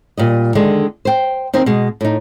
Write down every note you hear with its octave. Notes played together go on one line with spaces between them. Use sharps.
A#2 G3 D#5
D3 D#3 G#3 D4
C5 G5
D#2 C4 D#4 C5 D#5
B2 G#3
A2 D#4